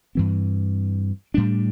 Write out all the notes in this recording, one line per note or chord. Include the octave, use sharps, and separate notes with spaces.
G2 E3 C4
A2 G3 D4